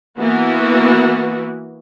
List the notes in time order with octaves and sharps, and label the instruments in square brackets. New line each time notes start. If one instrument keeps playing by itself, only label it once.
[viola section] E3 A#3 B3 F#4